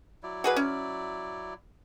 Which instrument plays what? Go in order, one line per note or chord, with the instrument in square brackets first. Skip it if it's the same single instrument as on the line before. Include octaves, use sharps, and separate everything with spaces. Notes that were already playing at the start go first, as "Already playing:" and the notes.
[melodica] F#3 E4 D5
[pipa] F#4 G#4 B4
C#4